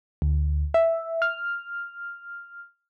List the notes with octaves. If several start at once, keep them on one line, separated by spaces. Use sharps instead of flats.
D2
E5
F6